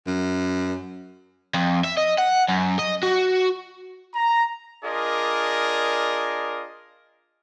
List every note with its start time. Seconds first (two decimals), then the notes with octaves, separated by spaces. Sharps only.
0.07 F#2
1.54 F2
1.84 E5
1.97 D#5
2.18 F#5
2.49 F#2
2.79 D#5
3.03 F#4
4.15 A#5
4.84 D4 F4 G#4 A#4 D5 D#5